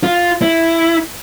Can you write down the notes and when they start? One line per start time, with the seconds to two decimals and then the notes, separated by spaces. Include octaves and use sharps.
0.03 F4
0.42 E4